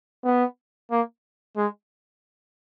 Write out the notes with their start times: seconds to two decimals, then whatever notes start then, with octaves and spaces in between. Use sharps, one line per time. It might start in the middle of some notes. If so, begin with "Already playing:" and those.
0.25 B3
0.91 A#3
1.57 G#3